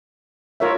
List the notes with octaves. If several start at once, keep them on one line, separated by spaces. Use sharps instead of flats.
F4 A#4 C#5 E5